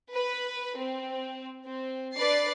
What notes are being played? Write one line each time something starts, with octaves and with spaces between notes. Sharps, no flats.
B4
C4
C4
D4 B4 D5 A6 C7